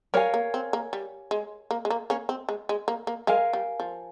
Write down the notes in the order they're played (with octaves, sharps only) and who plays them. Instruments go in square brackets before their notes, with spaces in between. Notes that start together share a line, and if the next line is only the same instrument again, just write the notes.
[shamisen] G3 [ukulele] A#4 C#5 F5 G#5
[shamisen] A#3
C4
A#3
G3
G#3
A#3
G#3
A#3
A#3 C#4
C4
G#3
G#3
A#3
A#3
[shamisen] G#3 [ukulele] A#4 F5 G#5
[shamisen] G3
F3